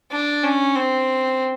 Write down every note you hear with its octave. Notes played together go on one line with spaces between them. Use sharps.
D4
C#4
C4